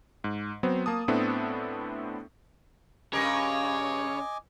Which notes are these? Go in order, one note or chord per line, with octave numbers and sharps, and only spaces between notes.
G#2
F#3 B3 C4 C5
A#3 A5 D#6
A2 B3 C4 D4 E4 A4
G2 C#3 G4 A#4 C#5 D#5 G#5 D6